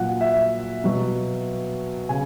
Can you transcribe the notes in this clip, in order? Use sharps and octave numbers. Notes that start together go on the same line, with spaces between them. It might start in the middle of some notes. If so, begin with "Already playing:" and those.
Already playing: A#2 F#3 F#5
E5
B2 F#3
C#3 G#5